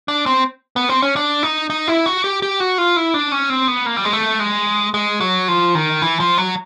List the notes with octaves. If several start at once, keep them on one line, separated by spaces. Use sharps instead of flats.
D4
C4
B3
C4
C#4
D4
D#4
D#4
E4
F#4
G4
G4
F#4
F4
E4
D4
C#4
C4
B3
A#3
G3
G#3
A3
G#3
G#3
F#3
F3
D#3
E3
F3
F#3